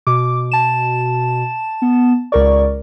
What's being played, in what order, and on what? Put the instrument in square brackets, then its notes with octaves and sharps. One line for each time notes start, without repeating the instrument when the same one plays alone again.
[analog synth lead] B2 [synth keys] D6
[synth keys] A5 E7
[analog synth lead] B3
[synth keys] C#2 A#4 D5 [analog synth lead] C#6